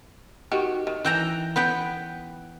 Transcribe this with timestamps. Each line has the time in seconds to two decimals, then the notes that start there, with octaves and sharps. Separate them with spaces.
0.51 D#3 F#4 G4
0.87 D#3
1.05 E3 G5 A#5
1.56 B3 B4 G5